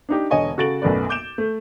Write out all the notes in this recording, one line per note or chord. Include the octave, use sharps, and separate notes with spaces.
D4 D#4 G4
E1 D3 C#5 D#5 G#5 C#6
C#3 F#4 A4 A6 D7 F#7
B1 F#2 A3 B3 D5
D6 G6 D7 E7
A3